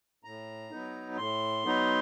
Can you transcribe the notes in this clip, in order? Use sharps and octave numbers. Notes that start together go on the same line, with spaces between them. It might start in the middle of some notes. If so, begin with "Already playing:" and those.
A2 A#5
F#3 B3 D#4
A2 C6
F#3 B3 D#4